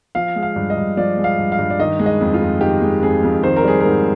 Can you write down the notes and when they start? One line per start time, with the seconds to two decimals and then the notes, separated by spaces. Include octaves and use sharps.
0.15 F3 F5
0.36 G#3
0.43 F5
0.56 G2
0.70 D#5
0.77 G2
0.97 F3 D5
1.17 G#3
1.24 F5
1.38 G2
1.52 F5
1.59 G2
1.70 D5
1.80 D#3 D#5
1.99 G#3
2.06 D#5
2.21 F2
2.34 F4
2.41 F2
2.61 D#3 G4
2.82 G#3
3.02 F2 G#4
3.23 F2
3.43 D#3 C5
3.57 A#4
3.64 G3 G#4
3.80 G#2 A#4